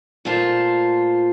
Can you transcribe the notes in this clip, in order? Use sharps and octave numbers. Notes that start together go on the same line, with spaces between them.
A#2 A3 F4 C5 A5